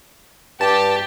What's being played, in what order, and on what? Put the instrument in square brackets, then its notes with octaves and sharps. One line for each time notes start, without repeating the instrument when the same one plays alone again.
[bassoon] G2 [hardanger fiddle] G4 [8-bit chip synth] A5